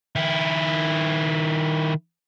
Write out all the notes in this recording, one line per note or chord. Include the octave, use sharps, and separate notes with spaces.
D#3 E4